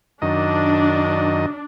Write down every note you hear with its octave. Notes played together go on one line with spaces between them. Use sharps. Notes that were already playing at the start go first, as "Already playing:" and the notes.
F#2 D#3 D4 D#5